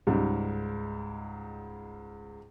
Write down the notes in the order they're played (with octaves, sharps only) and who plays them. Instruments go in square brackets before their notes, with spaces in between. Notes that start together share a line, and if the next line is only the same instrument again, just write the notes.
[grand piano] C#2 G#2 G3